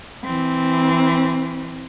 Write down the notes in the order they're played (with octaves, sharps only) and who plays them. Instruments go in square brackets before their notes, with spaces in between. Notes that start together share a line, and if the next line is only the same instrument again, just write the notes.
[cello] E3 C4